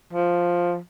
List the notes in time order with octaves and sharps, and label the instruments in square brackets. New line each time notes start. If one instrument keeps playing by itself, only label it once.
[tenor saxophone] F3